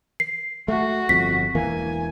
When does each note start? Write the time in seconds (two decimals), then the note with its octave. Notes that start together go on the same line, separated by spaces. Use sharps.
0.20 C7
0.68 A3 F#4
1.09 G1 F2 B6
1.55 E1 E3 A#3 G#5